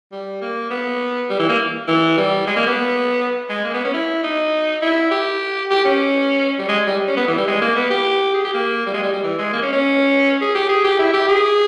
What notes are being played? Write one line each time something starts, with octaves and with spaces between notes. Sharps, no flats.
G3
A#3
B3
G3
E3
A#3
E3
G3
G#3
A#3
B3
G#3
A#3
B3
C#4
E4
D#4
E4
G4
G4
C#4
G3
G#3
G3
C#4
B3
E3
G3
G#3
A#3
B3
G4
G#4
G4
A#3
G3
G#3
G3
G3
E3
G#3
A#3
C#4
C#4
G#4
G4
G#4
G4
E4
G4
G#4